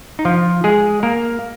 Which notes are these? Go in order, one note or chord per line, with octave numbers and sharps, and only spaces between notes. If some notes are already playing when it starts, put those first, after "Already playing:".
D#4
F3 F4
G#3 G#4
A#3 A#4